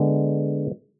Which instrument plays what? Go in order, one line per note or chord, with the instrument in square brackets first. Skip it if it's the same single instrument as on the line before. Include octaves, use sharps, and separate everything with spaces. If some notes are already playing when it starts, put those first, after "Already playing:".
Already playing: [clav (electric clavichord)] D3 G#3 B3